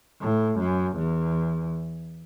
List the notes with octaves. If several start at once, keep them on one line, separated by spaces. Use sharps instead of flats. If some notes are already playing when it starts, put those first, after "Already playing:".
A2
F#2
E2